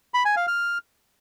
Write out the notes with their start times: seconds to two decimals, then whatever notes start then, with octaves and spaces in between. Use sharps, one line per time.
0.14 B5
0.25 G#5
0.36 F5
0.48 F6